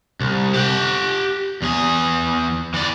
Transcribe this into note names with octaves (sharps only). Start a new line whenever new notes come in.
C2
G4 F#5
E2 G#4
E3 D5